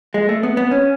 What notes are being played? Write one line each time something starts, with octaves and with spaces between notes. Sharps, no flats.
G#3
A3
B3
B3
C#4